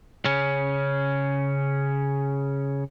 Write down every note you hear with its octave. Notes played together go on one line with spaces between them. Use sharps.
C#3 C#4